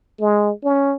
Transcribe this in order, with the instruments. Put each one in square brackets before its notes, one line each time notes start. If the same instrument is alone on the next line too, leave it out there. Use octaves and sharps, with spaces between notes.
[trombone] G#3
C#4